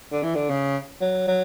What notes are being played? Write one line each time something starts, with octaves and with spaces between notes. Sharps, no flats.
D3
E3
D3
C#3
F#3
F#3